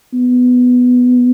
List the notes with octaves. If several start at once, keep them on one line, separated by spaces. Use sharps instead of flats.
B3